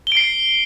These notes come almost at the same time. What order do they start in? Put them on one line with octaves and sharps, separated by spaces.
G7 D7 C7